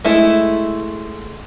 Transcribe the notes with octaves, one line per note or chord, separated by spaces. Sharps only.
G#3 A3 E4